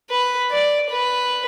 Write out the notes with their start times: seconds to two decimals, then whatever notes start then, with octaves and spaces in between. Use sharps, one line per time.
0.11 B4
0.51 D5
0.91 B4